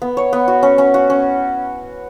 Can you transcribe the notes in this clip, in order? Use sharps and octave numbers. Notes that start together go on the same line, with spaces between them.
B3
C#5
B3
F#4
C#4
C#4
F#4
C#4